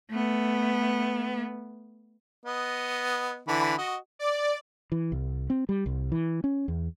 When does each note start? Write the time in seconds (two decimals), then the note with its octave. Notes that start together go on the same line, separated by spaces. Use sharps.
0.11 A3 B3
2.45 B3 D#5
3.48 D3 E3 B5
3.78 F#4 D#5
4.19 D5
4.92 E3
5.12 C2
5.50 C4
5.69 G3
5.86 C2
6.12 E3
6.44 C#4
6.68 E2